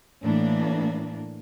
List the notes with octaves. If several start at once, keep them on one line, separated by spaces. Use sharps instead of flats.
A2 E3 A#3 D4